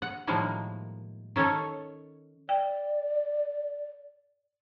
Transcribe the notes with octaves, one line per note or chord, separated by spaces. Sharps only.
F#5
A2 D#3 F3 G3 G#3 A#3
D#3 C#4 A4 C#5
D5 G5